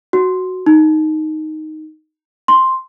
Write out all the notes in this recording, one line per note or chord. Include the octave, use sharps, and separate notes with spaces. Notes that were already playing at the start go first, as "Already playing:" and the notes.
F#4
D#4
C6